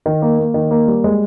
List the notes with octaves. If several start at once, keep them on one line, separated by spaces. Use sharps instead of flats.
D#3
A#3
A#3
D#3
A#3
G3
G#3